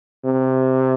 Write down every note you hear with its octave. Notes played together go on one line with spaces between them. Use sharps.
C3